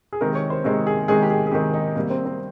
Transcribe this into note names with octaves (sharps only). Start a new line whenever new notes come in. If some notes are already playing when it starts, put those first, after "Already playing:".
G#4
C3 D#3 G#3 A#4
C#5
C5
C3 D#3 G#3
G#4
C3 D#3 G#3 G#4
G4
G#4
G#4
C3 D#3 G#3 G4
D#4
C3 G3 A#3
C4
C4